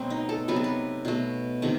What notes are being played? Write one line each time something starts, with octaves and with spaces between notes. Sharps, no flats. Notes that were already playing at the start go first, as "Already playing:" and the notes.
Already playing: B2 F#3 A3 C4
D#4
A4
C3 F#3 B3 B4
A4
B4
B2 A3
C3 D#3 A3